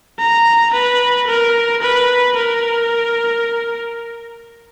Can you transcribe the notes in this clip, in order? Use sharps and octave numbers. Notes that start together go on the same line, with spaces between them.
A#5
B4
A#4
B4
A#4